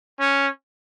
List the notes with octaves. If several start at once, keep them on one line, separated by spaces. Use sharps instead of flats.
C#4